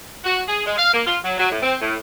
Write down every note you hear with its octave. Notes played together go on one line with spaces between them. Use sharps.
F#4
G#4
G#3
F5
A#3
F4
F#3
F#3
A2
C4
A2